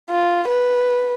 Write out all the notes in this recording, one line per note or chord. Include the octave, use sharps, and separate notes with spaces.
F4
B4